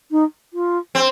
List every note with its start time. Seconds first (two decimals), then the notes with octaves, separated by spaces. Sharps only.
0.11 D#4
0.53 F4
0.95 C4